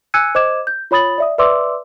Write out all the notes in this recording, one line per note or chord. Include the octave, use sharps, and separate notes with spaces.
G#5 E6 F#6 G#6 C#7 D#7
C5 D#5 D6 G#6 E7
G6
F4 C#5 B5 D#6 A6 F#7
D5 E5 D#6
B4 D5 E5 C6 D6 E6